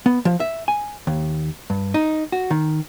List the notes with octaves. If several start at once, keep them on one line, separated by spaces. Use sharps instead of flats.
B3
F3
E5
G#5
D#2
G2
D#4
F#4
D#3